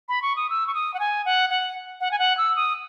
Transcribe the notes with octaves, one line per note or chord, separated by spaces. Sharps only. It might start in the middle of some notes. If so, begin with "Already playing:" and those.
B5
C#6
D#6
E6
C#6
D#6
F#5
G#5
F#5
F#5
F#5
G#5
F#5
E6
D#6